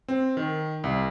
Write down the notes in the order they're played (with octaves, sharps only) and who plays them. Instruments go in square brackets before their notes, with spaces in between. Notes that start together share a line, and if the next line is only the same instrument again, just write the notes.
[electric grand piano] C4
D#3
C2